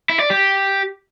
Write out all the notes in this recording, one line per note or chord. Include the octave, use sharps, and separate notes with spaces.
E4
D5
G4